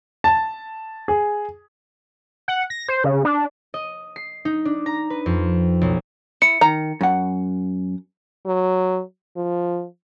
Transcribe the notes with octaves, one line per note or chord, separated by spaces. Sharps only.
A5
G#4
F#5
A#6
C5
C#3
D4
D#5
C7
D#4
D4
A#5
B4
F2
B1
E4 C#7
D#3 A#5
F#2 F#5
F#3
F3